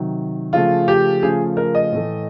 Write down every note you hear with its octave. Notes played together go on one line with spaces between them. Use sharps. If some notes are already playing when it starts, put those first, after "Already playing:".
Already playing: C3 D#3 F#3
C#3 F3 A3 F4
G4
C#3 F3 A3 G#4
A#4
D#5
A2 E3 A3